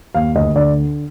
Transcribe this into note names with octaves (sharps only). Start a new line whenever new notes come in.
D#2 F5
D2 D#5
D3 D5